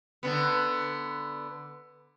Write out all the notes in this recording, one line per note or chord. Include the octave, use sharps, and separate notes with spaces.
D3 B3